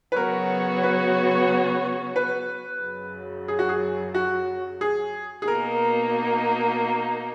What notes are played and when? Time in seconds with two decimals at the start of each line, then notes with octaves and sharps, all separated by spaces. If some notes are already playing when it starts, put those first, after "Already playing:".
0.12 B4
0.16 C#3 F#3 B3 F#4 A#4 C#5
0.83 B4
2.16 B4
2.82 F#2 C#3 F#3
3.48 G#4
3.59 F#4
3.69 G#4
4.15 F#4
4.81 G#4
5.42 G#4
5.48 B2 A#3 D#4 A#4